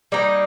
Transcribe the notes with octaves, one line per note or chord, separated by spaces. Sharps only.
G3 A#3 D#4